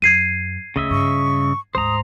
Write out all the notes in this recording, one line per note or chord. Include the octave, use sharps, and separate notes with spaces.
F#2 G#6 C7 D#7
D2 C#3 D#5 E5
G2 C#6
D2 G#2 C5 A#5 D#6